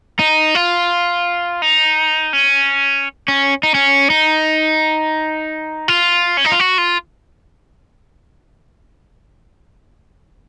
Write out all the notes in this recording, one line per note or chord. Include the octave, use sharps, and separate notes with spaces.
D#4
F4
D#4
C#4
C#4
D#4
C#4
D#4
F4
C#4
D#4
F4
F#4
F4